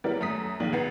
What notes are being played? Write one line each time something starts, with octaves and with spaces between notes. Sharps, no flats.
F#3 G3 B3 E4 A#4 D5
F#2 A3 D#6 B6
A#1 D#3 A#3 D5 F#7
C2 B2 B3 F#5 A6 C7